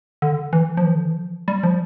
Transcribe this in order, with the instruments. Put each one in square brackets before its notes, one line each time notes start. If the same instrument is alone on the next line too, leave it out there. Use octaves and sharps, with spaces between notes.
[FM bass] D3
E3
F3
E3
D3
E3
F3
G3
F3